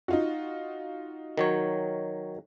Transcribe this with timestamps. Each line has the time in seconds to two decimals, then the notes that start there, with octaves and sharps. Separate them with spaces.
0.08 D#4 F4 F#4
1.38 D#3 F#3 C#5